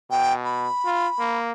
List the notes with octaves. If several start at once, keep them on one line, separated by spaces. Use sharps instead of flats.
B2 G5
B5
F4
A#3